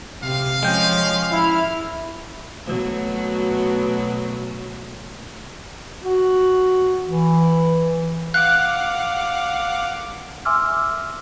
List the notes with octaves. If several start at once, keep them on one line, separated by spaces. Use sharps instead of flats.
C3 F5
F3 G#3 C#4 F4 G5
E4 F6
B2 F#3 A3
F#4
E3
F5 F#5 D6 F#6
E5 G#5 C6 D6 E6 F6